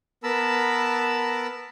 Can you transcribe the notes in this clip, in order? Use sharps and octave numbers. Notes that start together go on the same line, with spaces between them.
B3 A#4 A5 B5 E6